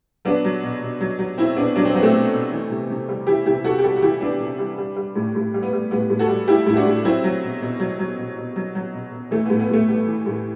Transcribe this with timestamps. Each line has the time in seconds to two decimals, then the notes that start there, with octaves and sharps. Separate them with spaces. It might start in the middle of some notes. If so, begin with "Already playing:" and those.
0.25 F#3 B3 D4
0.44 F#3
0.63 B2
0.82 B2
1.01 F#3
1.19 F#3
1.38 B2 C4 E4
1.57 B2 B3 D4
1.76 F#3 D4
1.85 C4
1.94 F#3 B3
2.02 A3 C4
2.14 B2
2.32 B2
2.52 E3
2.70 C3
2.90 C3
3.09 G3
3.27 E3 E4 G4
3.46 C3 E4 G4
3.64 C3 F#4 A4
3.79 G4
3.84 G3 F#4 A4
3.96 F#4
4.02 E3 E4 G4
4.21 C3 B3 D4
4.40 C3
4.59 G3
4.78 G3
4.96 G3
5.16 A2
5.35 A2
5.54 G3
5.63 B3
5.73 G3
5.91 A2 B3
6.10 A2
6.19 F#4 A4
6.29 G3
6.48 G3 E4 G4
6.66 A2 E4
6.76 D4 F#4
6.86 A2
7.04 F#3 C4 E4
7.24 F#3
7.43 B2
7.62 B2
7.80 F#3
7.99 F#3
8.18 B2
8.37 B2
8.56 F#3
8.75 F#3
8.94 B2
9.12 B2
9.31 E3 A3
9.45 A2 B3
9.60 B3
9.69 A2 A3
9.89 G3 B3
10.07 E3
10.26 A2